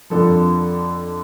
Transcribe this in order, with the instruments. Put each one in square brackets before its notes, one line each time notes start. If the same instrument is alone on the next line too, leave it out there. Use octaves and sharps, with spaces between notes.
[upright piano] F2 D3 F3 A4